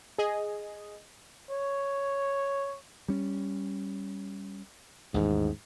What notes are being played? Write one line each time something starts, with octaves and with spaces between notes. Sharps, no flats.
G#4 D#5
C#5
G3 C#4
A1 D#2 G#2 D#3